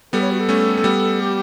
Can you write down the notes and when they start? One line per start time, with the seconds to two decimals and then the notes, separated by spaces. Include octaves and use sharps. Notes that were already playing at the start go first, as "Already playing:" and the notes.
0.13 G3 B3 A4
0.21 C#5
0.31 F#4
0.40 A4
0.49 A3 C#4
0.77 A3
0.84 G3 B3
1.20 G4